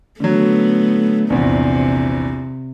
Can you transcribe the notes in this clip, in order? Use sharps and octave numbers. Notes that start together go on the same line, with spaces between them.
D3 F#3 A3 B3
A#1 E2 C3